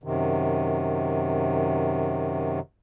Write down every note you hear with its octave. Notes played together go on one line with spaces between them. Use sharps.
F#2 C3 D#3